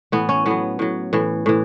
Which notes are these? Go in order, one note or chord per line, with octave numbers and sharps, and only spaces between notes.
A2 E3 B3
C#4
A2 F#3 B3
A2 F#3
A2 E3
A2 E3